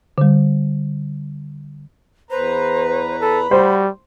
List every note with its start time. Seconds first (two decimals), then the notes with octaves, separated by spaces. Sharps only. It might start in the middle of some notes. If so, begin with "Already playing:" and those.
0.18 D3 G3
2.31 E2 B4 C5 A#5
3.21 A4 B5
3.51 G3 F#4 C5